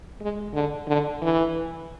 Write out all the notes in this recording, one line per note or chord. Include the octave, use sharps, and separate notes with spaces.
G#3
D3
D3
E3